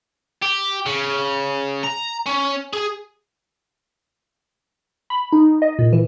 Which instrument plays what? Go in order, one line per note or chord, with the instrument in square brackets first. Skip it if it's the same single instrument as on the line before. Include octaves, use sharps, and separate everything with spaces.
[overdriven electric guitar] G4
C#3
A#5
C#4
G#4
[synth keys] B5
D#4
D#5
A#2
E3